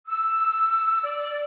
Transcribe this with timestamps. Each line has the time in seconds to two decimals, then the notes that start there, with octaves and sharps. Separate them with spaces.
0.07 E6
1.03 D5